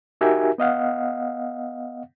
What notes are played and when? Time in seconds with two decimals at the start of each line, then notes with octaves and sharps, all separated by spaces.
0.21 D#4 F#4 G4 A#4 E5 G#5
0.58 B3 D#5 F5 F#5